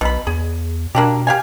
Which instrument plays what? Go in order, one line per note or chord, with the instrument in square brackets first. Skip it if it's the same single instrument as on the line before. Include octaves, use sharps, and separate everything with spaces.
[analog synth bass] B1 [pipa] B2 B5
[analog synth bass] E2 [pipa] G#4
[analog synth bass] B2 [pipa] A#3 D4 G4
[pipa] G4 F5 G#5